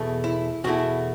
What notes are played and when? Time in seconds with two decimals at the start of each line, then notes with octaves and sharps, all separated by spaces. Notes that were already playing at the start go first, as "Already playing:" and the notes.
Already playing: E2 B2 A3
0.24 E4
0.64 E2 B2 A3 E4 F#4